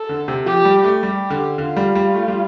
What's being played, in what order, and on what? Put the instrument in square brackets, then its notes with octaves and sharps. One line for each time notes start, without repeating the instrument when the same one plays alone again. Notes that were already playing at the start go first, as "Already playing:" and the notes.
Already playing: [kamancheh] A4
[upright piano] D3
C3
[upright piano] F3 [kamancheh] G4
[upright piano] G3
A3
[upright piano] G3 [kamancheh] G4
[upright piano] D3
[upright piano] D3 [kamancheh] F4
[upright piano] G3
G3
A3
G3